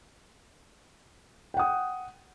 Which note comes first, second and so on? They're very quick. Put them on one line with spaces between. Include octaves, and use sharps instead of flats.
G5 F#5 D#6